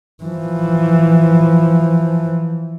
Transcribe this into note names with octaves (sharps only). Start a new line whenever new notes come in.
E3 F3